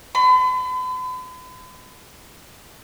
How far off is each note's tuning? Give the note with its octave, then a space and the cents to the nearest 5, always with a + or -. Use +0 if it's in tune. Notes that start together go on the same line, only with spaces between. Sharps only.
B5 +45